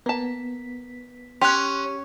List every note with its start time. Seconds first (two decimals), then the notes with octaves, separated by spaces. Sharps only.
0.06 A#3 B3 A5 B6
1.41 C#4 G4 C6 F#6